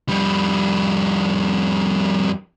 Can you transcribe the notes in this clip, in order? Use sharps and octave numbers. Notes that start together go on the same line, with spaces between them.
F2 G3